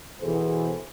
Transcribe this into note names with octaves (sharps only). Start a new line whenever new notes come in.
B2 E3 G#4 A4 C5